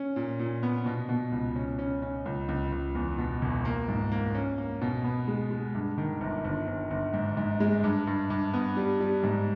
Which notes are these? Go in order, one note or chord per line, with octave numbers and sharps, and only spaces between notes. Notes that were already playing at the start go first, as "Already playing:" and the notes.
Already playing: C#4
A#2
A#2
B3
B2
B2
C#2
C#4
C#4
C#4
C#2
C#2
C#2
E2
B2
E1
A#3
G#2
A#3
C#4
A#3
B2
B3
G#3
G#3
G2
D#3
G1
G1
G1
G1
G#2
G#2
G#3
G2
G2
G2
B3
G3
G3
G#2